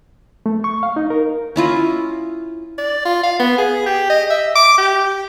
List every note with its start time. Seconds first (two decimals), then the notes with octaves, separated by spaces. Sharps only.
0.46 A3
0.64 C#6
0.83 F5
0.96 D#4
1.10 A#4
1.56 C#4 E4 F4 D#5
2.78 D5
3.05 F4
3.23 F5
3.39 B3
3.58 G#4
3.86 G4
4.10 D#5
4.30 E5
4.55 D6
4.78 G4